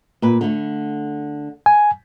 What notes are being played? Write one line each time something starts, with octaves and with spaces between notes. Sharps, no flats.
A#2 B4
D3 A3
G#5